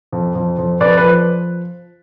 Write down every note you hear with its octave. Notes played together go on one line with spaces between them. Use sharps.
F2
F2
F2
F2 B4 D5
B4
F3